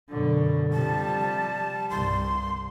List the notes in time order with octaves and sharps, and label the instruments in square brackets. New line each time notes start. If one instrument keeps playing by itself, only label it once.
[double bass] F#2 B2 [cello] D3
[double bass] C3 F3 [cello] G3 [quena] A5
[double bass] C2 G2 [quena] C6